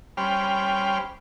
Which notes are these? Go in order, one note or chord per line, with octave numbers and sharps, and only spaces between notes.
G3 C#4 C5 G5 B5 F6